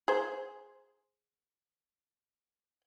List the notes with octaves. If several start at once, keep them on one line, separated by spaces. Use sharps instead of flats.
G#4 C5